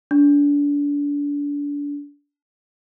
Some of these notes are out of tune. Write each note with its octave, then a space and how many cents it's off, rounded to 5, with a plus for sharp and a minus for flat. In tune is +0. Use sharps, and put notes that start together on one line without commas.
D4 -30